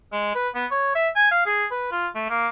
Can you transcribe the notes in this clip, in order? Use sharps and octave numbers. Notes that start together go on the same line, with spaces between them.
G#3
B4
B3
C#5
E5
G#5
F5
G#4
B4
F4
A3
A#3